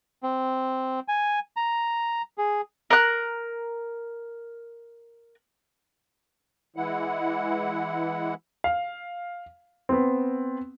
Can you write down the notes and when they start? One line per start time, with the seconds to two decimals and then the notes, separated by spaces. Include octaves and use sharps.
0.23 C4
1.08 G#5
1.56 A#5
2.38 G#4
2.90 A#4 F#6
6.76 E3 G#3 E4 F#5
8.64 F5
9.89 B3 C4